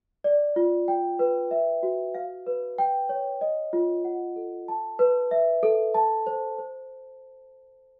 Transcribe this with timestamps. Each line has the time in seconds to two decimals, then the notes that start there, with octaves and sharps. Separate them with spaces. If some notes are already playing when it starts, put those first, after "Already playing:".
0.24 D5
0.56 F4
0.88 G5
1.19 B4
1.51 E5
1.83 F#4
2.15 F5
2.47 B4
2.78 G5
3.09 C#5
3.41 D#5
3.73 F4
4.05 F#5
4.36 A4
4.68 A5
4.99 B4
5.31 E5
5.63 A4
5.94 A5
6.27 C5
6.59 C5